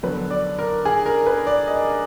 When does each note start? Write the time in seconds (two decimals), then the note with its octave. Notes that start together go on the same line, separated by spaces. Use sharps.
0.03 D3 F#3 B3 B4
0.30 D5
0.59 A#4
0.85 G#4
1.06 A#4
1.26 B4
1.47 D5
1.67 D#5